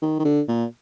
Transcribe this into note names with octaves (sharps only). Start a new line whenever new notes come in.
D#3
D#3
D3
A#2